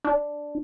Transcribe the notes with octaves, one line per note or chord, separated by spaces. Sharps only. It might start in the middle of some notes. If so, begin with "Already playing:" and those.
D4